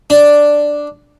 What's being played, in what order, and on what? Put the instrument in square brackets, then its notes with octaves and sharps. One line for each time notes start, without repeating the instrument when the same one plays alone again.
[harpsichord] D4